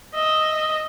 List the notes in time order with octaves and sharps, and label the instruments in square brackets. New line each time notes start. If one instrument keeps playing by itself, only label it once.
[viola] D#5 E5